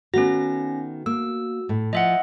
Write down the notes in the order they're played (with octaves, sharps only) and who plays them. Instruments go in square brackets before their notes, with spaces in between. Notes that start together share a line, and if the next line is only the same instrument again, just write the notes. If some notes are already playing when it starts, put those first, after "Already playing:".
[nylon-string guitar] D#3 A3 B3 [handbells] C#4 A#6 [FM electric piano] F#4
[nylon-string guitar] A#3 [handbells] E6
[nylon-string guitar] A2
[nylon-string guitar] F3 [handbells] D#5 E5 F#5